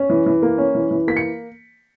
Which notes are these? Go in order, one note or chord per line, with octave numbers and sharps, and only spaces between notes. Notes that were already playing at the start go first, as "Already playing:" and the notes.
Already playing: C#4
E3
E3
A#3
C#4
E3
E3
A#3 B6
C#7